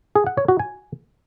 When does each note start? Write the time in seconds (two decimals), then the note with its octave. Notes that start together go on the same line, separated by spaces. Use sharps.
0.15 G#4
0.26 F#5
0.37 C#5
0.48 F#4
0.59 G#5